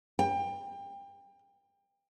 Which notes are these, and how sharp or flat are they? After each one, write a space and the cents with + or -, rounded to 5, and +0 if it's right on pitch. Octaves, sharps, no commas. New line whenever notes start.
G5 +25